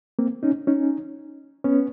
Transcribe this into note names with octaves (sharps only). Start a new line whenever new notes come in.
A#3 C4
C#4 D#4
C#4 D#4
B3 C#4